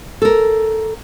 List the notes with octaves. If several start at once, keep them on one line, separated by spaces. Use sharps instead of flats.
A4 A#4